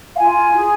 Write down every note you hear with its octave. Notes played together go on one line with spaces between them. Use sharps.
F5
F4 G#5
G#4